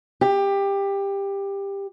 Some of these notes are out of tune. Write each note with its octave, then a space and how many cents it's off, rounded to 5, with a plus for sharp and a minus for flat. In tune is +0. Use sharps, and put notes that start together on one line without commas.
G4 +15